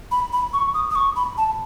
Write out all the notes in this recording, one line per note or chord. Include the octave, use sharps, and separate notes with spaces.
B5
B5
C#6
D#6
D#6
C#6
B5
A5